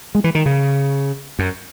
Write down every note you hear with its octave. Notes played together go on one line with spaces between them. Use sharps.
G#3
E3
D#3
C#3
F#2